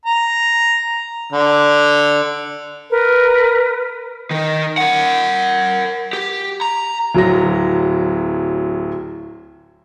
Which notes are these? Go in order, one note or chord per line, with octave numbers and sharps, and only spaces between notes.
A#5
D3
A#4 B4
D#3 D#4
A#4 F#5
G4
A#5
D1 F#3 A#6